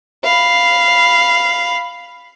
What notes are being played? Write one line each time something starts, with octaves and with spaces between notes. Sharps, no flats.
F5 B5